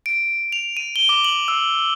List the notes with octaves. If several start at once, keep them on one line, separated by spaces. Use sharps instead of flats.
D7
F7
D#7
G7
D6
F#7
E6